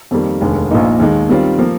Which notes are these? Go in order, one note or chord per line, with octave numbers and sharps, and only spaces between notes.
F2 D#3 G3 A#3
F1 D#2 D3 G#3
A#1 A#2 F3 A#3 D#4
D#2 D#3 G#3 D#4
D#3 G3 C4 F4
F3 A#3